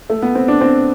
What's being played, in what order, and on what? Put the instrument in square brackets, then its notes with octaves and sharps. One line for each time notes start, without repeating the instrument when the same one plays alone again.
[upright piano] A3
B3
C4
D4
C4